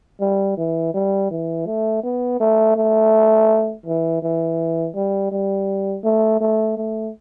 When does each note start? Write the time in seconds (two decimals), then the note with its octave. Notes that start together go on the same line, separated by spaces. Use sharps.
0.21 G3
0.57 E3
0.94 G3
1.31 E3
1.66 A3
2.03 B3
2.40 A3
2.76 A3
3.86 E3
4.22 E3
4.95 G3
5.32 G3
6.04 A3
6.41 A3
6.77 A3